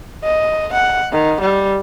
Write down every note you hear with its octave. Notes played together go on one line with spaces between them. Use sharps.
D#5
F#5
D#3
G3